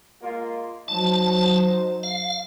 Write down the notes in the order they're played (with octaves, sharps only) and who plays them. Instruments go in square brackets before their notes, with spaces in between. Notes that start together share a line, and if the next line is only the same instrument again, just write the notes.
[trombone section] G#3 A#3 F4
[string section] F#3 [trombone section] D#4 C5 [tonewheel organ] A5
[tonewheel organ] F5